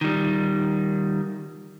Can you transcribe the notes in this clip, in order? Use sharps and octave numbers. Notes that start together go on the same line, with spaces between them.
D#3 G3